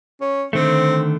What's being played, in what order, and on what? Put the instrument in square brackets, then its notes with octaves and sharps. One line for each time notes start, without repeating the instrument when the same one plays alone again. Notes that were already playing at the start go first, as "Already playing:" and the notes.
[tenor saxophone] C#4
[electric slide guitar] D3 D#3 A3 [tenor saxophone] C4